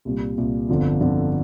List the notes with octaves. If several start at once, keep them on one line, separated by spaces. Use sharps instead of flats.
C2 A#2 G3
C2 A#2 G3
G1 F2 D3 F3
G1 F2 D3 F3